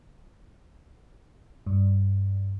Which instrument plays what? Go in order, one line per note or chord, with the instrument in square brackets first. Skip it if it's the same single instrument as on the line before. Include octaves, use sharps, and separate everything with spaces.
[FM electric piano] G2